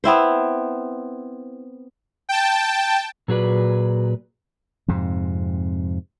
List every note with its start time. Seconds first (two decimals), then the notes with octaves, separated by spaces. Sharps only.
0.04 B3 C4 E4 C5
2.29 G5 A5
3.28 A#2 F#3 F#4 G#4 B4 D5
4.88 F2 G#2 C3